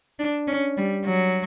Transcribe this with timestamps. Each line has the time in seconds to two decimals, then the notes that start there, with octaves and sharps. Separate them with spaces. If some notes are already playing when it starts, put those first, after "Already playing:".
0.19 D4
0.48 C#4
0.77 G3
1.05 F#3